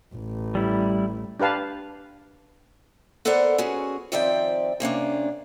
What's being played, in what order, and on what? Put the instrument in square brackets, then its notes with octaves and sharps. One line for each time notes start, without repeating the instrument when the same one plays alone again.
[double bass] A1
[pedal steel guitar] G3 E4
[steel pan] D4 G4 B4 F5 A5
[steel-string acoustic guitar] B3 A4 A#4 C5 D5 F#5
C#4 F#4 G#4
D#3 F3 C4 D5 E5 G5
C3 A#3 C#4 D4